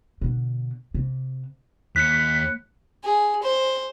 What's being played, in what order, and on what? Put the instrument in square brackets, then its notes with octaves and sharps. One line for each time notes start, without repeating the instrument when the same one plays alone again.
[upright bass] B2 D3
C3
[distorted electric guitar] D#2 [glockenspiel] F#6 C#7 [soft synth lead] B6
[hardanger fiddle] G#4
C5